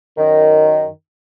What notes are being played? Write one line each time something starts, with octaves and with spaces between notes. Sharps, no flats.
F#2 D#3